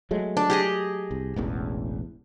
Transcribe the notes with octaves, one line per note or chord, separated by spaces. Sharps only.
F#3 G#3 A3
D4
G4 G#4 D#5
C2
E1 A1 E2